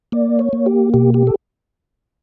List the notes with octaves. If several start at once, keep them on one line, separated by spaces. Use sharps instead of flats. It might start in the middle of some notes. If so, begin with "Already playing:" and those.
A#3 D5
C#5
A#3
G4
B2 G4
G4
A4